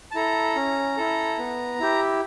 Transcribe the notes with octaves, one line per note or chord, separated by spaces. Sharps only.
A5
E4 A4 A#5
C#4
E4 A4
B3
E4 G4